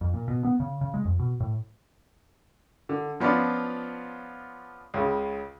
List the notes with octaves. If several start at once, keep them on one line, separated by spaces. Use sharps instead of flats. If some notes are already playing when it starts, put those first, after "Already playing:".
F2
A#2
B2
B3
C#3
C#3
G#3
F2
B2
A2
D3
F3 B3 C#4 D4 F4
C#2 C#3